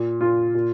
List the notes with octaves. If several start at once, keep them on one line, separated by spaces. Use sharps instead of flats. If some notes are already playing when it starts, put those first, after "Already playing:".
Already playing: A#2
A#2 F4
A#2